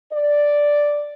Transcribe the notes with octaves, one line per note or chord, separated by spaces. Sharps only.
D5